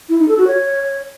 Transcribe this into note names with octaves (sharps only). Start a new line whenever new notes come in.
E4
D#4
A4
F#4
C#5